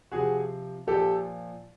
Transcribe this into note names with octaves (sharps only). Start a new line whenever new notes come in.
C3 F3 F#4 G#4
A#2 F3 G4 A4